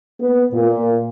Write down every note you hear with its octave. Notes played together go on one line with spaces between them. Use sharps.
B3
A#2